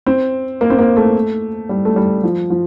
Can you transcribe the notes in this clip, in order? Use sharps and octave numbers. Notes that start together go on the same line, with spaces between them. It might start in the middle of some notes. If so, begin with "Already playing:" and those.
C4
A#3
C4
A#3
A3
G3
A3
G3
F3
F3